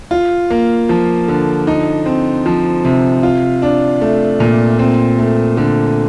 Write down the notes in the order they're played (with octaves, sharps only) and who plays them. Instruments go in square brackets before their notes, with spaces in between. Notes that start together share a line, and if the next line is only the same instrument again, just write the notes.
[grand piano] F4
A#3
F3
D3
D#4
C4
F3
C3
F4
D4
A3
A#2
C4
A3
D3